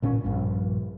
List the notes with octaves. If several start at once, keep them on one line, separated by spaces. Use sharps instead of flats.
A1 A#2 C#4
A#1 G2